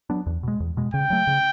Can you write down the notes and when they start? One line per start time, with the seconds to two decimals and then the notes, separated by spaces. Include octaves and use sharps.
0.10 F#3 B3 D4
0.26 E2
0.43 B2 G#3
0.60 E2
0.77 B2 G#3
0.94 C#3 G5
1.10 F#3 A3
1.27 C#3